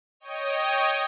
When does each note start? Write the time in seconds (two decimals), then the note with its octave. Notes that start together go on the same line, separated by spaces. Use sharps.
0.20 C#5 D#5 G5 D#6